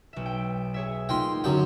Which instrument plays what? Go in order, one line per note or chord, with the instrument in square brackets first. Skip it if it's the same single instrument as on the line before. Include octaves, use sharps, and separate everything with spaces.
[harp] B1 E5
G5
G#4 C#5 E5
[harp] A#3 D#4 F4 [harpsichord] G5 C6
[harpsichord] F#2 G5 [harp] D3 C4 C#4